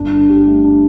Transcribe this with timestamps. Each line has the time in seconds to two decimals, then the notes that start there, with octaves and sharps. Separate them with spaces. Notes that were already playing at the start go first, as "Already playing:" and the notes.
Already playing: G1 D4
0.11 D3
0.29 G4
0.46 A3
0.64 D4